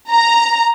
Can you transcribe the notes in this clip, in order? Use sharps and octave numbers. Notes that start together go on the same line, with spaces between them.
A#5